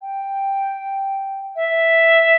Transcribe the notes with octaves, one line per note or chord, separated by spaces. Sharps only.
G5
E5